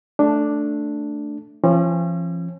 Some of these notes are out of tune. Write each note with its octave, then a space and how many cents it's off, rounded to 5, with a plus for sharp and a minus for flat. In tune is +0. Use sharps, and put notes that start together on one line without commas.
A3 +0 D4 +0
F3 -35 C#4 -40